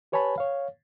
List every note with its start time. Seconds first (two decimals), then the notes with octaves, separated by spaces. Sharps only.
0.12 G4 B4 C#5 G#5 A5 B5
0.38 C#5 F5